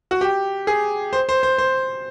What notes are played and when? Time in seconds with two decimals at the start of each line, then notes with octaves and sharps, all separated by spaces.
0.11 F#4
0.21 G4
0.67 G#4
1.13 C5
1.29 C5
1.43 C5
1.58 C5